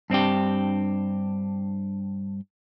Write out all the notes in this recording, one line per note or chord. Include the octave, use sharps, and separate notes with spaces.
G2 C4 D4 G4